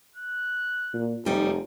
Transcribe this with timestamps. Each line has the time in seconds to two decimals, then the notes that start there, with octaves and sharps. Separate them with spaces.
0.16 F#6
0.94 A#2
1.25 F1 F#2 G3 D#4